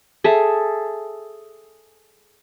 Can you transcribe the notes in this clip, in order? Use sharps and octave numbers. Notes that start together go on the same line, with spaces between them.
G#4 A4 E5